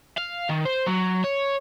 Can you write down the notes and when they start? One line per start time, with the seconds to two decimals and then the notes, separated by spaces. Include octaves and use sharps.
0.18 F5
0.49 D#3
0.66 C5
0.87 F#3
1.24 C#5